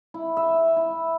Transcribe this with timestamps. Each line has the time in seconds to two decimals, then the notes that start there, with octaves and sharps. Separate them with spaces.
0.14 E4
0.37 E5
0.77 E4